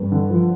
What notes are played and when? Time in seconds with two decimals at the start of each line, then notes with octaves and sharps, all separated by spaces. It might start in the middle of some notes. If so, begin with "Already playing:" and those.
Already playing: G2
0.12 D3
0.30 F3